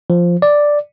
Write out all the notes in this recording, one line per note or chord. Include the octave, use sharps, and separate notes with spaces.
F3
D5